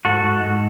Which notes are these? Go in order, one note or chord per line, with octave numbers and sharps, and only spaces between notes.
G#2 F#4 A4
G#2
G#2